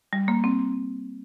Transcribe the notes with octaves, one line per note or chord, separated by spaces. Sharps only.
G3
A#3
C4